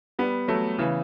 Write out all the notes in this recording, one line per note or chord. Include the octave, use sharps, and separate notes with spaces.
G3 B3
F#3 A3
C#3 E3